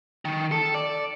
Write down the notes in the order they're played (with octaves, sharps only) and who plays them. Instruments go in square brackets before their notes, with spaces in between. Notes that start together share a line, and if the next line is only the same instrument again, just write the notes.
[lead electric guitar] D#3
A4
D5